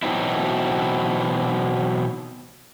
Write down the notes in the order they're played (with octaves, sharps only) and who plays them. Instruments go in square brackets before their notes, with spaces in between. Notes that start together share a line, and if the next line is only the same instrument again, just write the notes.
[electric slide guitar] B2 E3 F#3 C4 D#4 E4